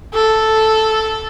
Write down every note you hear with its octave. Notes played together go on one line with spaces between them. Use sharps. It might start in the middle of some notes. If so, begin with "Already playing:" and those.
A4